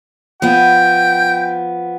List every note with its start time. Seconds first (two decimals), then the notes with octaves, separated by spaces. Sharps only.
0.42 F3 B3 G5